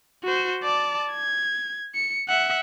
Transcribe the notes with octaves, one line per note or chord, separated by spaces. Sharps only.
F#4 C5
D5 A5
G#6
C#7
E5 F#5